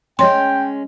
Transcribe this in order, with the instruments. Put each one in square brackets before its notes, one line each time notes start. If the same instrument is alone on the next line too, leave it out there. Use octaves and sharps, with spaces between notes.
[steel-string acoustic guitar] G#3 C#4 [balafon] C#5 C6 [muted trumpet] G5